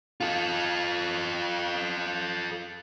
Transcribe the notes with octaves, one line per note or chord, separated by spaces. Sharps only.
F4 A4